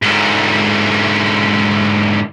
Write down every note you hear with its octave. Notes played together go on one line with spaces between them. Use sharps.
G#2 D3